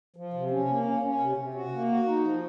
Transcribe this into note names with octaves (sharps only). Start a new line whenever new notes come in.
F3
C3
C#4
A#3
C#4
C#4
C3
C3
F#4
A#3
F#4
D#4
F3